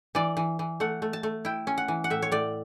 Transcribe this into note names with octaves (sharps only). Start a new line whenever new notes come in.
E3 D5
E3
E3
A3 F#5
A3
A5
A3
E4 G5
C#4
F#5
E3
F#5
A2 E5
C#5
A2 D5